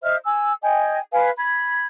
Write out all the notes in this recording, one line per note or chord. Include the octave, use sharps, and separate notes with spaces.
C5 D#5 E5 F6
G#5 E6
D#5 G5 G#5
B4 F5 G#5
B5 G#6